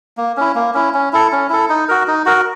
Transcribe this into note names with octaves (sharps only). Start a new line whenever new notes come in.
A#3
C#4 E4
A#3
C#4 E4
C#4
E4 A4
C#4
E4 A4
D#4
F#4 A#4
D#4
F#4 A#4